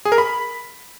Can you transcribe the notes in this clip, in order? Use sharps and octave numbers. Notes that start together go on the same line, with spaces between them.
G#4
A#4
B5